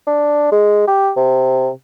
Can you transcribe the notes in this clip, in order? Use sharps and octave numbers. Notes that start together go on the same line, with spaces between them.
D4
G#3
G4
C3